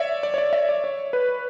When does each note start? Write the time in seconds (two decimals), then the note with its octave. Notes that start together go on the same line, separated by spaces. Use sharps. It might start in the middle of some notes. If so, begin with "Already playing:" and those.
Already playing: C#5 D5 E5
0.23 D5
0.34 C#5
0.38 D5
0.53 E5
0.69 D5
0.84 C#5
1.13 B4